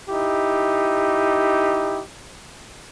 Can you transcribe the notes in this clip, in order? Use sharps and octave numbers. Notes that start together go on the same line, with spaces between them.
D#4 E4 G4